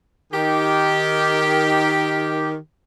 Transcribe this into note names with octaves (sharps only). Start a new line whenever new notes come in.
D#3 G4